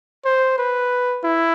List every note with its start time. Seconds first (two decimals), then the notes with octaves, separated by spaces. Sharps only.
0.25 C5
0.58 B4
1.24 E4